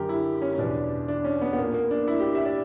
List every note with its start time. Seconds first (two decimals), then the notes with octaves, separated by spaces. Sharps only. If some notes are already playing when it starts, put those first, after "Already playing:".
Already playing: F#2 D3 G4 A#4
0.09 E4
0.42 C#4
0.54 C#4
0.58 E2 B2 D4
1.08 D4
1.24 C#4
1.41 B3
1.53 B3
1.58 A#2 A#3
1.74 A#3
1.91 D4
2.08 E4
2.20 G4
2.35 E5
2.45 D5